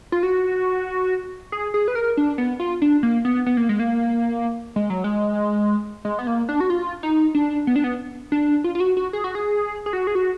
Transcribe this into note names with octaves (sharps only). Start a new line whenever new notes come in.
F4
F#4
G#4
G#4
B4
A#4
D4
B3
F4
D4
A#3
B3
B3
A#3
G#3
A#3
G#3
F#3
G#3
G#3
B3
A#3
D4
F#4
F4
D#4
D4
B3
D4
B3
D4
F4
F4
F#4
F#4
G#4
F#4
G#4
G#4
F#4
G#4
F#4